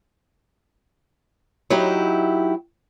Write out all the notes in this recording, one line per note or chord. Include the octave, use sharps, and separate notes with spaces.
F#3 D#4 E4 G4